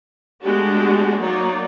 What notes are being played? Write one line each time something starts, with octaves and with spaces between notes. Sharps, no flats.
G#3 A3 B3 D4 F#4 G4
F#3 A#3 D#4 C#5 D5